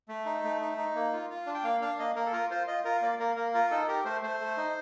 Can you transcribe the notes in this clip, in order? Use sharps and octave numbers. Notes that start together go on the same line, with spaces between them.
A3
D#4
A3
D#4
D#4
A#3
F4
F4
D4
G5
A#3 F5
D4 F5
A#3 D#5
A#3 A#4
A4
F4 A#4
F4 C5
F4 D#5
F4 A#4
A#3 D5
A#3 A#4
A#3 A#4
F4 A#4
D#4 A4
G4 A#4
A3 C5
A3 C5
A3
D#4